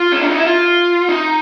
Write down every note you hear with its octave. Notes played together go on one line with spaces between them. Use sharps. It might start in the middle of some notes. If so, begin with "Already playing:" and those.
Already playing: F4
C#4
D4
D#4
E4
F4
D#4